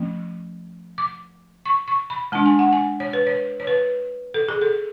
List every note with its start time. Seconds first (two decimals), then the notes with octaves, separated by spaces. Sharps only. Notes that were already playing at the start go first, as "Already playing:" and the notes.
Already playing: F3 A3 C#4
0.98 D6
1.66 C#6
1.88 C#6
2.10 B5
2.32 G#3 D4 A5
2.46 G#5
2.59 F#5
2.73 G#5
3.00 C#5
3.13 B4
3.27 C#5
3.60 C#5
3.67 B4
4.34 A4
4.48 G#4
4.61 A4